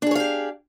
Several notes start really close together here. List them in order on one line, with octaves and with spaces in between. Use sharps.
D4 G#4 C#5 F5 G4